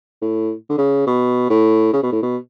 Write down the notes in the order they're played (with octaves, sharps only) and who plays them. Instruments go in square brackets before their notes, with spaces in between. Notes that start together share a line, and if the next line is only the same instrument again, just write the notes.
[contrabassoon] A2
D3
C#3
B2
A2
C#3
B2
A2
B2